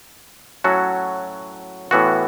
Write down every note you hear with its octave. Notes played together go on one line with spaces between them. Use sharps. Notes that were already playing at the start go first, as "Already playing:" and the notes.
A2 F#3 C#4 F#4 A4
A2 E3 B3 F#4